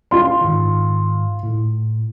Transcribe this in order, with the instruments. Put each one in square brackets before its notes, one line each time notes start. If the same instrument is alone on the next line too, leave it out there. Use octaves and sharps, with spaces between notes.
[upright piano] F4 C6
[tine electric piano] G#2 D#3
A2